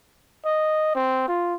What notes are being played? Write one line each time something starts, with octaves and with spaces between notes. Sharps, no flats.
D#5
C4
F4